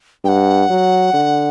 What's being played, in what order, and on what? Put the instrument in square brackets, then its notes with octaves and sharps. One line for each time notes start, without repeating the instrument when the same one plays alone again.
[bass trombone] G2 [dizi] G5
[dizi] F#5
[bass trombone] F#3
D3